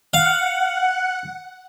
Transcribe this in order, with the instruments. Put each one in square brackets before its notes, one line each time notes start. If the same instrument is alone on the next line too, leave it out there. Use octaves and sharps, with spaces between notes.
[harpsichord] F5 [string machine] F#5